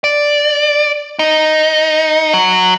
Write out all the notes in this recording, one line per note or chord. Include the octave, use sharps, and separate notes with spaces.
D5
D#4
F#3